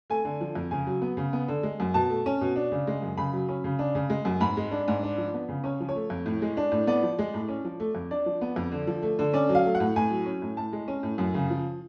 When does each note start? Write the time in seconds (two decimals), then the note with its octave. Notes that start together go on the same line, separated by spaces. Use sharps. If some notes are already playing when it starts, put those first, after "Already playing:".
0.10 A3 G#5
0.25 D3
0.41 F3
0.55 F2
0.71 C#3 G#5
0.87 F#3
1.02 B3
1.17 C#3
1.33 B3
1.48 D3
1.63 G#3
1.80 F#2
1.94 B2 A5
2.10 A3
2.26 C#4
2.41 B2
2.56 D4
2.72 C#3
2.87 G#3
3.02 F#2
3.17 C#3 B5
3.33 F#3
3.49 C#4
3.64 C#3
3.79 D4
3.95 C#3
4.10 G#3
4.25 F#2
4.41 G#2 B5
4.57 G#3
4.71 D4
4.88 G#2
5.03 D4
5.18 F3
5.34 B3
5.49 C#3
5.64 C#4 C#5
5.80 F3
5.89 C#5
5.96 A3
6.10 F2
6.26 A2
6.42 G#3
6.57 D4
6.72 A2
6.87 B3 D5
7.03 F3
7.19 G#3
7.34 A2
7.48 C#4
7.65 F3
7.80 A3
7.95 F2
8.11 D4 D5
8.26 F3
8.41 B3
8.56 F2
8.72 D3
8.87 F3
9.03 A3
9.19 D3
9.34 C#4 D5
9.49 F#3
9.55 F5
9.65 A3
9.75 F#5
9.80 A2
9.96 A2 G#5
10.10 F#3
10.26 C#4
10.42 A2
10.57 A2 A5
10.73 G#3
10.88 C#4
11.03 A2
11.18 F#2
11.34 C#3
11.50 F3